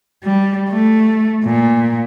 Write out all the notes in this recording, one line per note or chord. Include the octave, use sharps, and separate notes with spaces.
G3
A3
A#2